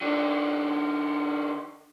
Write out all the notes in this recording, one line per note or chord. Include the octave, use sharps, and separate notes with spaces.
D#3 D4